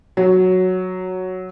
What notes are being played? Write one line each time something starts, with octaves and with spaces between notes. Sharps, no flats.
F#3